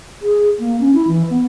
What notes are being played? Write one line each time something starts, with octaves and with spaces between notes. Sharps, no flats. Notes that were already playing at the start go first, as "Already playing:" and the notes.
G#4
A#3
C#4
E4
E3
B3